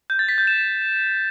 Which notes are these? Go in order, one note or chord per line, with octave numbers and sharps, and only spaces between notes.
G6
A6
B6
G6
E7